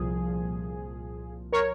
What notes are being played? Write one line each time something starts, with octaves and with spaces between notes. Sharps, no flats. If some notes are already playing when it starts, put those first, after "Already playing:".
Already playing: C2 A#2 F3 G#4
A#4 C#5